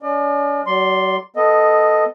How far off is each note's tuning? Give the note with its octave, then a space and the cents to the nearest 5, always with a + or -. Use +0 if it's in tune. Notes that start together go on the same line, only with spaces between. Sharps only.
C#4 +45 D5 +45
F#3 +35 D5 -5 C6 +0
B3 +0 A4 +0 D#5 +0